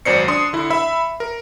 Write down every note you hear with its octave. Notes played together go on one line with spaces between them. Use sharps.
G#1 F#2 C5 D5 C7 C#7
D4 C6 D#6
D3 E4
E5 B5 E6
A#4